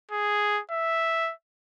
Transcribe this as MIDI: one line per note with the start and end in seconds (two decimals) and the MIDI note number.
0.11 0.61 68
0.71 1.32 76